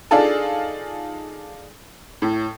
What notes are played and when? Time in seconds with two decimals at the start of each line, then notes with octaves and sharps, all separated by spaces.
0.11 D4 D#4 F4 G#4 A4 A5
2.22 A2